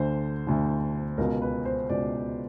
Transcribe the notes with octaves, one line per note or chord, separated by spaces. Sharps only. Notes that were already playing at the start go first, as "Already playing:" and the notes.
Already playing: D2 D3 C5
D2 D3
C#2 B2 A#4
B4
C5
C#2 B2 D5